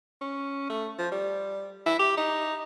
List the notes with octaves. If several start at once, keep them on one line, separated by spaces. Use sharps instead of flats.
C#4
A3
F3
G3
E4
G4
D#4